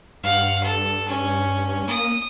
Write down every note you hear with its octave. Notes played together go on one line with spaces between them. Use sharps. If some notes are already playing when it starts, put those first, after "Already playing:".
G2 F5 F#5
A4
C#4
A#3 D#6